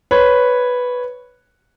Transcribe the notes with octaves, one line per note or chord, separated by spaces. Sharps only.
B4 C#5